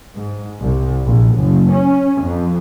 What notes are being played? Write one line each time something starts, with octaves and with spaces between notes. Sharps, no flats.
G#2
C2
A#1
F#1
C#4
F2